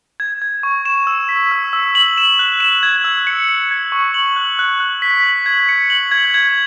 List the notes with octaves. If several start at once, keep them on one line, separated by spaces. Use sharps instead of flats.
G#6
G#6
C#6
E7
E6
B6
E6
E6
F#7
E7
F#6
E7
G#6
E6
C#7
C#7
G#6
C#6
F#7
F#6
F#6
F#6
B6
F#7
G#6
C#7
F#7
G#6
G#6